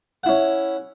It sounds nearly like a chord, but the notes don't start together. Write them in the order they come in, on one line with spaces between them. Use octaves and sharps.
F#5 E4 C#4